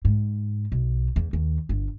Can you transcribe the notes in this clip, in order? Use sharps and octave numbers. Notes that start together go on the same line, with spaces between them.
G#2
B1
E2
D#2
G1